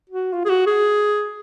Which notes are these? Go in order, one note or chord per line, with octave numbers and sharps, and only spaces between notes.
F#4
F4
G#4
F#4
G#4